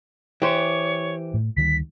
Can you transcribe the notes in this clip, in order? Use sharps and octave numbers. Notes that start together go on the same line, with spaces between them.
E3 G4 C5 C#5
A2
D2 D#3 G3 B6